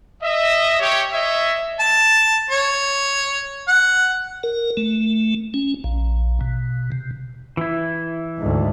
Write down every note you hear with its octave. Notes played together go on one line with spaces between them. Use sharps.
D#5 E5
G4 C#5
C#5 D#5 E5
A5
C#5
F#5
A#4
A3
C#4
A#1
B2
C3
E3 E4
D2 G#2